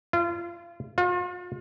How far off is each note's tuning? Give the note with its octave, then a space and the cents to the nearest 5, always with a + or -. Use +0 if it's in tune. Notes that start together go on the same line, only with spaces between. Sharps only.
F4 -30
F4 +40